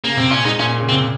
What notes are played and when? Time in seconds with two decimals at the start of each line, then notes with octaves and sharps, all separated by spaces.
0.04 C#3 A#3
0.17 C3 C4
0.31 A#2 C#4
0.45 G#2 D#4
0.59 A#2 C#4
0.80 C#3
0.89 C4
0.92 C3